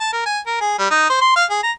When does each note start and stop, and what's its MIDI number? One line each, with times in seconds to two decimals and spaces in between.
0.01 0.12 81
0.13 0.23 70
0.26 0.39 80
0.47 0.58 70
0.61 0.75 68
0.79 0.88 55
0.91 1.05 63
1.10 1.21 72
1.21 1.32 84
1.36 1.45 77
1.50 1.63 68
1.63 1.71 82